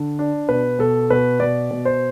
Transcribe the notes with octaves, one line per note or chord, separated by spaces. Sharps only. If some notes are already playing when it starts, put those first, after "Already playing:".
Already playing: D3
D4
B2 B4
B2 A4
B2 B4
B2 D5
B2
C5